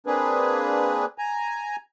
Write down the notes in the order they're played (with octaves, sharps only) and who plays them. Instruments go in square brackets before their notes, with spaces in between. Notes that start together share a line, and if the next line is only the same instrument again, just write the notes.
[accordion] A#3 C4 D4 G#4 B4
G#5 A#5